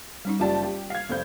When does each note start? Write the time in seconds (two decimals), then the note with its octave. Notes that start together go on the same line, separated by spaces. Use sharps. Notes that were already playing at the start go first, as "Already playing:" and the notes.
0.25 G3 C#4 D#4
0.40 F#1 F4 G4 D5 A5
0.63 G4
0.90 F5 G#6
1.09 F1 C4 G6